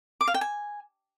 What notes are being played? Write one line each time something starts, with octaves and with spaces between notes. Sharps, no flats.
D6
F5
G5
G#5